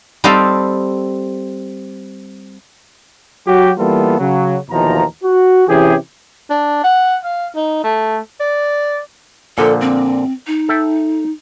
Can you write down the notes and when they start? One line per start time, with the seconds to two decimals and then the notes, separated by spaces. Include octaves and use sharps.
0.24 G3 C4 A4 D#5 F5 G5
3.47 F#3 F#4 G4
3.78 E3 G3 A#3 B3 F4 A4
4.19 C#3 F#3
4.70 D#2 B2 E3 F3 A#5
5.24 F#4
5.68 C3 E3 C#4 G4 G#4
6.50 D4
6.84 F#5
7.23 F5
7.55 D#4
7.84 A3
8.40 D5
9.58 A#2 D3 F3 A4
9.81 C4
10.47 D#4
10.69 A4 E5 G5